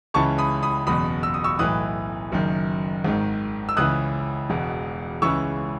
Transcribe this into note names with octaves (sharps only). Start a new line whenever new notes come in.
C#2 C#3 E3 A5 C#6
B5 D#6
B5 D#6
F#1 E2 B2 B5 D#6
E6
D#6
C#6 E6
B1 A2 E3 D#6 F#6
F#1 F#2 D#3
G#1 G#2 D#3
E6
C#2 C#3 E3 D#6 F#6
E1 E2 B2
C#2 C#3 E3 C#6 E6